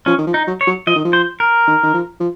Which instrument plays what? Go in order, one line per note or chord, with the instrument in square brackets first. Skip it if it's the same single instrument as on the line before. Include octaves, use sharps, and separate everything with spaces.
[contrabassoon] F3 [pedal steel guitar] C#4
[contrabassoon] D#3
F3
[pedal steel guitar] D#4
[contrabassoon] F#3
[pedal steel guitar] C#5
[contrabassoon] F#3
[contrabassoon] F3 [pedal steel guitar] D#5
[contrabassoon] D#3
F3
[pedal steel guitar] C5
A#4
[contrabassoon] D#3
D#3
F3
F3